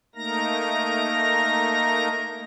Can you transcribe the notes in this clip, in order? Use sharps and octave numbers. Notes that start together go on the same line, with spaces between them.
A3 A#3 D#4 A#4 A#5 A#6